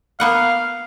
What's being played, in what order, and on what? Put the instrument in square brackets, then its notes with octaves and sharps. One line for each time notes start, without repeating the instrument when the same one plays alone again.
[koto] A#3 B3 F#5 [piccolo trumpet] F5